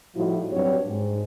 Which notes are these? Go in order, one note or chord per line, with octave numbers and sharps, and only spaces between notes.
A2 F3 G3 D#4 E4 F#4
G2 F#3 C4 F#4 G4 C#5
G#2